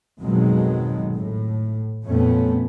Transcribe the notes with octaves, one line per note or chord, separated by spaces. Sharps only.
G#1 F2 B2 D#3 F#3 G#3
A2
F2 A#2 A3 B3 C#4